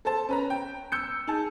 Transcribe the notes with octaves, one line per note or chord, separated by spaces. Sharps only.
A4 C5 A5
C#4 B4 A#5
G5
E6 G6 C#7
D#4 G#4 A5